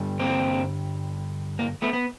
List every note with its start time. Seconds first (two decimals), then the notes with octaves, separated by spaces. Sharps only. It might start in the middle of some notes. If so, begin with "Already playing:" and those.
Already playing: G2 D3 G3
0.20 A#3 C4
1.59 A#3
1.82 A3 B3
1.93 B3